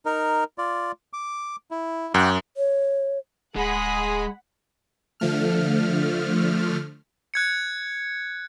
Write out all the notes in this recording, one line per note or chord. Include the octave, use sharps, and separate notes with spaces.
D#4 A#4
F4 D5
D6
E4
F#2 F#5 G5 D6
C#5
D1 G#3 G#4 F#5 B5
D3 F3 A3 F6
F#6 G#6 C#7